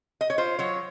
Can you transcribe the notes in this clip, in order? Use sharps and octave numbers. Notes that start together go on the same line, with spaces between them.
D#5
C#5
F4 C5
F#3 C#5